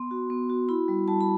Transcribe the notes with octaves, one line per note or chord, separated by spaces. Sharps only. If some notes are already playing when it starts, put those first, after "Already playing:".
Already playing: B3 C6
F#4
B3
F#4
E4 B5
G3
G3 A5
B5